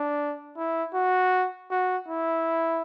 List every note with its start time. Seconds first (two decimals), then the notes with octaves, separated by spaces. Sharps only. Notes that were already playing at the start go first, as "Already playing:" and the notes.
Already playing: D4
0.57 E4
0.95 F#4
1.71 F#4
2.09 E4